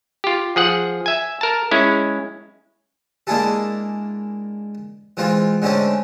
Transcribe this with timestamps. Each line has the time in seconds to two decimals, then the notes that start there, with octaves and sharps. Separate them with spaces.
0.24 F4 G4
0.56 F3 G#4 F#5
1.06 E5 G#5
1.41 A#4 A5
1.71 G#3 C#4 E4
3.27 G#3 A#3 D4 E4 G#4 A4
5.17 E3 G#3 C4 F4
5.62 D3 G#3 A3 C4 C#4